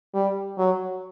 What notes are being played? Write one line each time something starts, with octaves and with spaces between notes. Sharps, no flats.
G3
F#3